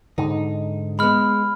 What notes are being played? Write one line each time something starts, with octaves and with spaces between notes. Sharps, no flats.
G#2 D3 D#4
G#3 B3 B5 F6